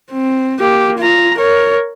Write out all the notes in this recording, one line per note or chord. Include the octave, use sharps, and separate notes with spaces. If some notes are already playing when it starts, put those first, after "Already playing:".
C4
A#3 G4
F4 A#5
A#4 C#5